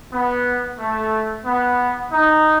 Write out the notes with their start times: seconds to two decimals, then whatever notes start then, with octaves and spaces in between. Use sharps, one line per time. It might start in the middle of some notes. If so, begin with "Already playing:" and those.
0.11 B3
0.79 A3
1.45 B3
2.12 D#4